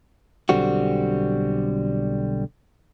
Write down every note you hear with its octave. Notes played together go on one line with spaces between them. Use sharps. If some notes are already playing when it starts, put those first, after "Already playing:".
B1 D3 G3 C4 F#4